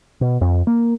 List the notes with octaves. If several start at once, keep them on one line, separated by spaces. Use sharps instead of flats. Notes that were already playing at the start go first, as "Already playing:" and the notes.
B2
F2
A#3